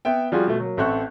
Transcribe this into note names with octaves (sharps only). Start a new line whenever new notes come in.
B3 E5 G5
F3 G3 F4 F#4 G#4
B2 A3
F#3 A#3
A1 C4 A4 E5 C#6 F#6